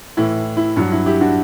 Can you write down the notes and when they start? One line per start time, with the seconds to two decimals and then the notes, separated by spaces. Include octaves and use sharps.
0.17 A2 E3 E4
0.57 E4
0.76 G2 F#3 D4
0.92 E4
1.06 E4 G4
1.21 D4 F#4